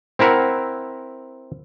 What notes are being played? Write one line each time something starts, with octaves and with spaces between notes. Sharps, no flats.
C4 E4 A#4 E5 F#5